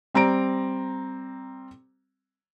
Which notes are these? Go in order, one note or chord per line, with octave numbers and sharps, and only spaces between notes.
G3 C4 A#5 D7